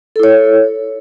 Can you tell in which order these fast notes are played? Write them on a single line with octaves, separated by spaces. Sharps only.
A4 E4 C#5